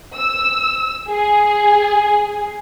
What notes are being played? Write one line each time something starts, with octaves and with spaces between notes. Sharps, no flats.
E6
G#4